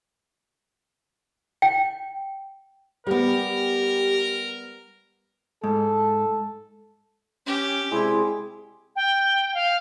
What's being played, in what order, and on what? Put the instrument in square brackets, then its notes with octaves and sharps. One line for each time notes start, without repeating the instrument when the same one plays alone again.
[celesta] G5
[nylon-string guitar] G3 B3 [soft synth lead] G4 [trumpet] A#4
[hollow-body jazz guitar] G#2 [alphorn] A4
[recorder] C#4 [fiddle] G4
[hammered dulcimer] C3 G#3 D5 [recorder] E4
[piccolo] G5
F5